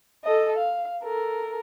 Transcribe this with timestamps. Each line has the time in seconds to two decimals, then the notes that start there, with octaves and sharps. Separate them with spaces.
0.25 A4 D#5
0.57 F5
1.03 A4 A#4